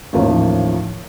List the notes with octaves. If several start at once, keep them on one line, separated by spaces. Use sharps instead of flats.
A1 D#2 F3 A#4 C#5